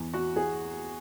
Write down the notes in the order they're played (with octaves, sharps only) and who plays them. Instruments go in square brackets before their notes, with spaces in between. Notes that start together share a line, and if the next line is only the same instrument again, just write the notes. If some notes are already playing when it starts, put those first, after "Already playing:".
Already playing: [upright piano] E2
F#4
G#4